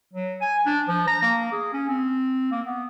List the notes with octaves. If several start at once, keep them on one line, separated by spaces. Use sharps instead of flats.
F#3
G#5
D4
F3
A#5
A#3
G#4
C#4
C4
A#3
B3